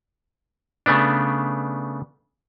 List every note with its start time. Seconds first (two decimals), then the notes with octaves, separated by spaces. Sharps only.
0.86 C#3 A3 B3 D4